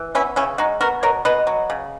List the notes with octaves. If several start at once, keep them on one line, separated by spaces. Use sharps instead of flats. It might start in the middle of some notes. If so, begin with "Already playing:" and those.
Already playing: E3
B3 C#4 E4
C#3 C#4 E4
G#3 D#4 F#4
B3 F#4 A#4
B2 A#4 C#5
B2 B4 D#5
F#3
C#3